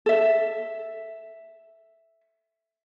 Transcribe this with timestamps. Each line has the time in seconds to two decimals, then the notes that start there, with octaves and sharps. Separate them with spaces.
0.06 A4 E5